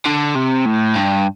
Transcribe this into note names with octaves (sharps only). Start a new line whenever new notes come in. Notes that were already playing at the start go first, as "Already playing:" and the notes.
D3
C3
A2
G2